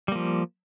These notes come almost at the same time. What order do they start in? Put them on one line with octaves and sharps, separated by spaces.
G3 A#3 F3